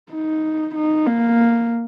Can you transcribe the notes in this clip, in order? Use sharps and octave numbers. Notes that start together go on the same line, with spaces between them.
D#4
D#4
A#3